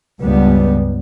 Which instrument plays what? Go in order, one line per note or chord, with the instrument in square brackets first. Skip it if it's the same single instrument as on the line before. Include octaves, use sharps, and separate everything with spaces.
[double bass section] C#2 G2 G3 B3